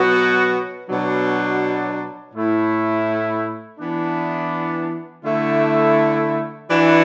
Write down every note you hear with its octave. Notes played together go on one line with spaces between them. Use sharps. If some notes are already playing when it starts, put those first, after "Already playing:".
Already playing: B2 F#3 B3 F#4
B2 F#3 D4
A2 A3 E4
E3 B3 D4
D3 A3 E4
E3 D4 F#4